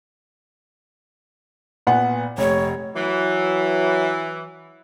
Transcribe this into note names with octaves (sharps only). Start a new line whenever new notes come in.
A#2 B3 F#5
F1 C#5
E3 F#3